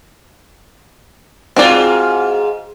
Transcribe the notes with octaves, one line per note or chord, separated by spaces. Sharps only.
G#2 C4 F4 F#4 D5